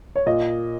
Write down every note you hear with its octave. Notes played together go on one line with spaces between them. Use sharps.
C#5
A#2 D#5